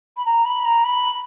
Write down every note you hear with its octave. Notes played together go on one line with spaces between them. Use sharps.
B5
A#5
B5
A#5
B5